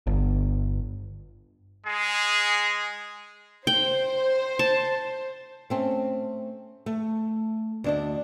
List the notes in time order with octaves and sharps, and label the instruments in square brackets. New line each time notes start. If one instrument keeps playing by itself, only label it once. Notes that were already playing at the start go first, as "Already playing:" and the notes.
[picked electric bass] G1
[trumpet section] G#3 G#4
[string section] C5 [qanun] G5
[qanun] A5
[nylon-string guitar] A3 C4 C#4
A3
D2 D4 D#5